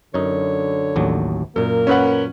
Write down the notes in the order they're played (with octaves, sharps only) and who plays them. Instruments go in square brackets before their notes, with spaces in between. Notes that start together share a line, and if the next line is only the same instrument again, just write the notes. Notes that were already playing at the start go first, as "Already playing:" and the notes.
[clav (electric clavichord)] F#2 D#4 [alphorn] D3 [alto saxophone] C#5
[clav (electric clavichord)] A1 D#2 F#3
[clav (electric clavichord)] F#2 A#2 [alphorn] A#3 [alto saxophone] A#4
[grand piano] C#4 B4 F#5